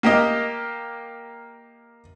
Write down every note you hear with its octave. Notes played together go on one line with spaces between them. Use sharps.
A#3 G4 A#4 D#5